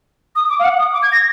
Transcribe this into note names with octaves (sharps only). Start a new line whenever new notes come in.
D#6
D6
F5
F#5
D#6
D6
G#6
A#6